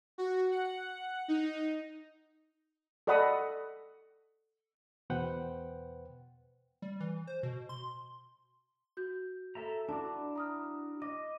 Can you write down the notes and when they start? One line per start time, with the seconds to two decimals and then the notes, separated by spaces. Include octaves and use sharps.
0.18 F#4
0.51 F#5
1.28 D#4
3.07 A4 D5 D#5 F#5 B5 D#6
5.10 E2 B2 B4 C5 F#5 G5
6.82 G3
7.00 E3
7.27 C5
7.43 B2
7.69 C6
8.97 F#4 G6
9.55 A4 E5 A#5
9.89 D4 E4 F#4 A5 D6
10.36 A#5 D#6 F6
11.02 D#5 D6